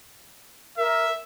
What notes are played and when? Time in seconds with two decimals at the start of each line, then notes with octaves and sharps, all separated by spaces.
0.78 A#4 E5